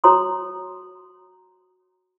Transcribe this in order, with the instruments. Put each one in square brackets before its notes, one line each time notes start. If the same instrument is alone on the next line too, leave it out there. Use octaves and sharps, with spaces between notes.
[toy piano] F#4 C#5 A#5 C6 D#6